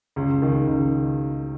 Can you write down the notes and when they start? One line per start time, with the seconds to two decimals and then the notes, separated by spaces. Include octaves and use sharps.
0.16 C#2
0.42 D#3
0.67 C#2